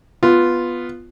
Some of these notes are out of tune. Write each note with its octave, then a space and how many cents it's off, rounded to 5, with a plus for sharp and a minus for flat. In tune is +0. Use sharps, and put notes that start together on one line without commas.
B3 +0 F4 +0